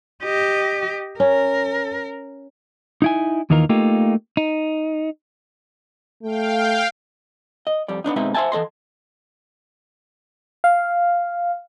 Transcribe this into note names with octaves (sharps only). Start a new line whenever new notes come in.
G4 D#5
C#4 A#4
D#4 E4 G#5
D#2 D#3 E3 D#4 F4 A#4
A3 A#3 D#4 F4 G4
D#4
A3 F5 G5
D#5
F2 G3 D5
B3 C4 D4 D#4
B2 G#3 C4 D#4 B4 E5
C5 D#5 E5 G#5 A5
E3 A4 D#5 C6
F5